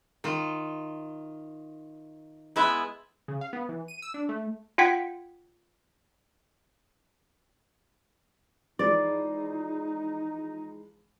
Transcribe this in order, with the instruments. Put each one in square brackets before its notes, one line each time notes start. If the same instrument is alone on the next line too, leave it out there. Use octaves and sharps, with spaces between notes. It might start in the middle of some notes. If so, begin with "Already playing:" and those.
[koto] D#3 F4
G#3 B3 E4 B4 E5
[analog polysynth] C#3
F5
B3
E3
D#7
E6
D4
A3
[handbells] F4 F#5 G5 G#6 B6
[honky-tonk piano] E3 F3 G#3 [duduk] D#4 [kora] D5